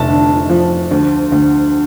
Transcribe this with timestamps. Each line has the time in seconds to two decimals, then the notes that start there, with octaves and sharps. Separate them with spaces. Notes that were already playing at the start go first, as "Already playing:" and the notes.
Already playing: F1 E5 A5
0.08 D3
0.50 F3
0.91 D2
1.32 D2